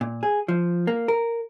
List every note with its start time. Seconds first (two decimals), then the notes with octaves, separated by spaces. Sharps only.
0.01 A#2
0.23 G#4
0.48 F3
0.87 A#3
1.08 A#4